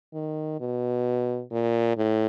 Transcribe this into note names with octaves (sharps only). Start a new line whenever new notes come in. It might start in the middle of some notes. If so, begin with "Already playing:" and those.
D#3
B2
A#2
A2